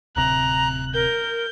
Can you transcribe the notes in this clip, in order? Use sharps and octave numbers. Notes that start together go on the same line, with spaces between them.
D1 C3 A#5 F#6
A#4 G6